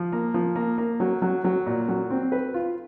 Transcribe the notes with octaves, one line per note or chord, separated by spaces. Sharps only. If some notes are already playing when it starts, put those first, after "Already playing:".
Already playing: F3
A#3
F3
A#3
A#3
F#3
F#3
F#3
A#2
F#3
C4
B4
F4